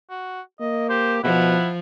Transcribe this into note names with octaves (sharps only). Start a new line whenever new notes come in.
F#4
A#3 D#5
G4 C5
B2 F3 E4 F#5